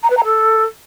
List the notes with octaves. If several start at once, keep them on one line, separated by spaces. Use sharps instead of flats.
A#5
B4
A#5
A4